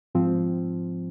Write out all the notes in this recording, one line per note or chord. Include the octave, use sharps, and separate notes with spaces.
G#2 F3 C4